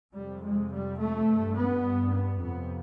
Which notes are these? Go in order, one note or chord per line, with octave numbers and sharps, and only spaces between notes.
F2 C3 G3
G#3
G3
A3
G2
B3
B3
F2 C3 B3